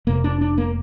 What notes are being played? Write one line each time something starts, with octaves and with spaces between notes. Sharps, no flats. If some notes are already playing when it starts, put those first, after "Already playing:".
F1 F2 C3 A#3
D4
D4
A#3